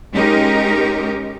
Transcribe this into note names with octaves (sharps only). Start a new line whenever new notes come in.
G#3 C#4 D#4 G4 A#4